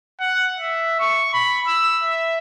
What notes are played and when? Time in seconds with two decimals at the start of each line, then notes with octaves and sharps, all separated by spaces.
0.20 F#5
0.59 E5
1.00 C#6
1.33 B5
1.67 E6
2.03 E5